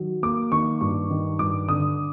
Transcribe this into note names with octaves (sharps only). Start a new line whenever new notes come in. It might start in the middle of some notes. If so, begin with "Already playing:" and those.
Already playing: D#3 F#3
A#3 D6
D#3 C#6
G2 C#6
D#3
G2 D6
D3 D#6